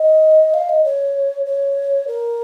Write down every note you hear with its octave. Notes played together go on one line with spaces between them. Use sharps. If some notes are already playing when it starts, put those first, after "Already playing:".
Already playing: D#5
F5
D#5
C#5
C#5
A#4